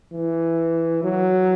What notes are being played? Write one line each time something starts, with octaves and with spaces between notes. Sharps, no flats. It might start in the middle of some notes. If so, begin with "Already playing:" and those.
E3
F#3